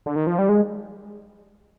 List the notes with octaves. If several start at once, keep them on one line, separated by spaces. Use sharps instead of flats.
D3
D#3
F3
G3
G#3